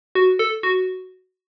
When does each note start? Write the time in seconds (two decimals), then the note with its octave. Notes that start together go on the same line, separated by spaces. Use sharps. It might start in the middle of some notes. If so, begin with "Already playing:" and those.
0.15 F#4
0.39 A4
0.63 F#4